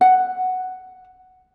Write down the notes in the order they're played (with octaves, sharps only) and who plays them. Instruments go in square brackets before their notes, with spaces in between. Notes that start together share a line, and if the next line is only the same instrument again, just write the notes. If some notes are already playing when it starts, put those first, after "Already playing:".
[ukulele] F#5